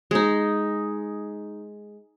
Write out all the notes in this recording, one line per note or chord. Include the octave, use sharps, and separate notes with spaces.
G#3 D#4